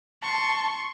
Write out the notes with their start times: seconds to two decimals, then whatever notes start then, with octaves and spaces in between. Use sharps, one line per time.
0.23 A5 C6 C#6